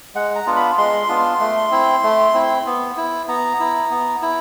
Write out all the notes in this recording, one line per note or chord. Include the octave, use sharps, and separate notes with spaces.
G#3 F#5
A#5
B3 D4 F4
B5
G#3 C6
B3 D4 F4
A3
C4 E4
A3
C4 E4
B3
E4
B3 A#5
E4
B3
E4